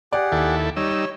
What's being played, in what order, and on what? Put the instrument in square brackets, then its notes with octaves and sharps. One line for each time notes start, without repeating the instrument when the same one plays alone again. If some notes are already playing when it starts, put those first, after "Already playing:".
[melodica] G4 G#4 F#5 [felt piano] D5
[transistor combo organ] D#2 E4 A4
[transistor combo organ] G3 D#4 E6 [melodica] C#5